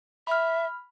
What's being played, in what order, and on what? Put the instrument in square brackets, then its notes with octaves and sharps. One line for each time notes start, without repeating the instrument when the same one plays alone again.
[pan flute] E5 [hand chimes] B5 F6